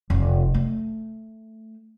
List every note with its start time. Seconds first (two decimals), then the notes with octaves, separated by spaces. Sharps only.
0.10 F1 D#2
0.54 A3